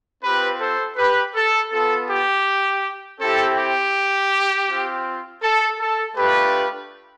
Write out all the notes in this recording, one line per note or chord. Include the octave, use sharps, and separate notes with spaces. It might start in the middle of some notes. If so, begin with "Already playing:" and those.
C4 F4 G4 B4
A4 C5
G4 B4
A4
B3 F4 A4
G4
C4 E4 G4 A4
G4
C4 F4
A4
A4
A3 D4 F4 G4 B4